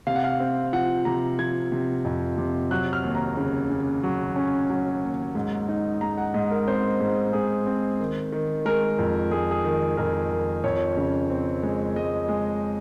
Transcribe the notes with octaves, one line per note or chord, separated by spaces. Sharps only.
C3 F5
F#5
F5
C4
F3 F#5
C3 A#5
F3 G#6
C3
F2
C3
F#3 F#6
F6
D#2
A#5
C#3
C#3
F#3
C#4
F#3
D#2
G#2
D#4
G#2 A#5
F#5
G#2 D#5
A#4
C4 C5
G#2
G#2 G#4
C4
D#3
D#3
G#3 A#4
F2
G#3 G#4
G#4
D#3
F2 A#4
D#3
F2 C#5
C#3
C4
G#3
G#3 D#5
G#3